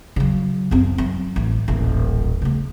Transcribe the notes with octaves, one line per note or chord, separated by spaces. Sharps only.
C#3 F#3
F#2 C4
F#3
A1
D#1 A1
C#3 A3